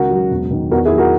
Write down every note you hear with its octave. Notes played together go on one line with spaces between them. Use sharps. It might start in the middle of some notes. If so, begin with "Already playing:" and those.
Already playing: C#2 D#3 F#4 A#4
F#3
E1
D#3
E2 F#4 A#4
E4 G#4
F#3
F#4 A#4